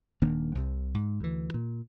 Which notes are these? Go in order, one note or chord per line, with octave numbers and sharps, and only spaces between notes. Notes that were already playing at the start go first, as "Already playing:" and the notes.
D#1 D#3 A#3 D4
C2 C3
G#2
D2 E3
A#2